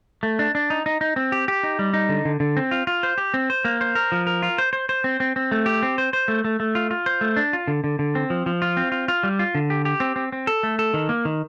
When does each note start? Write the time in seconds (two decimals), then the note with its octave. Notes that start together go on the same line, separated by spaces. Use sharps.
0.23 A3
0.39 D4
0.55 D4
0.70 D#4
0.86 D#4
1.01 D#4
1.16 C4
1.32 G4
1.48 G4
1.63 D#4
1.79 G3
1.94 D#4
2.09 D3
2.25 D3
2.40 D3
2.57 C4
2.71 F4
2.87 F4
3.03 C5
3.18 G4
3.34 C4
3.50 C5
3.65 A#3
3.81 C5
3.95 A#4
4.12 F3
4.27 A#4
4.43 F4
4.58 C5
4.73 C5
4.89 C5
5.04 C4
5.20 C4
5.36 C4
5.52 A3
5.66 G4
5.83 C4
5.98 C5
6.13 C5
6.28 A3
6.45 A3
6.60 A3
6.75 F4
6.91 F4
7.06 C5
7.21 A3
7.37 D4
7.53 F4
7.68 D3
7.84 D3
7.99 D3
8.15 C4
8.30 F3
8.46 F3
8.62 F4
8.77 C4
8.92 F4
9.08 F4
9.23 G3
9.39 F4
9.55 D3
9.70 G4
9.85 G4
10.00 C4
10.16 C4
10.32 C4
10.47 A4
10.63 A3
10.79 A4
10.94 D#3
11.09 A#3
11.25 D#3